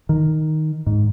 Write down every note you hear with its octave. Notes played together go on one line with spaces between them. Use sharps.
D#3
G#2